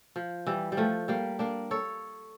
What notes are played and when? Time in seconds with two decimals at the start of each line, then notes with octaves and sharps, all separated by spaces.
0.16 F3
0.46 E3 G3
0.72 G3
0.77 F3 A3
1.08 G3 A#3
1.39 A#3 D4
1.71 A4 C#5